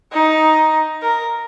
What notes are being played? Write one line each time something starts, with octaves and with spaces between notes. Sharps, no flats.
D#4
A#4